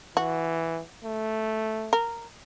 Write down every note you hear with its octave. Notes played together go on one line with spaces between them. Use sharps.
E3 F#4
A3
A#4